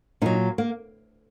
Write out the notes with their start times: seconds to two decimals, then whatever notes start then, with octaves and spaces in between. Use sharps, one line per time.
0.22 A#2 F#3 D#4
0.58 A#3